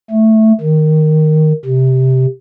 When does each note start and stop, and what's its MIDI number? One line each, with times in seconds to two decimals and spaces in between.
0.11 0.52 57
0.61 1.52 51
1.65 2.26 48